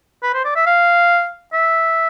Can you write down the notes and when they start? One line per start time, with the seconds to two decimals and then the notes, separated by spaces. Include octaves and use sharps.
0.23 B4
0.34 C5
0.45 D5
0.56 E5
0.66 F5
1.53 E5